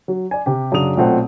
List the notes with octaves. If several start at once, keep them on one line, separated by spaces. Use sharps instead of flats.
F#3
D5 G#5
C3 G4
F#2 C#3 D4 F#4 D#6 F7
B1 A#2 A3 C4 F#5